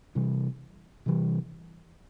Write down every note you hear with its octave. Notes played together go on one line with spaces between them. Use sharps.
C3 E3 G3
C3 E3 G3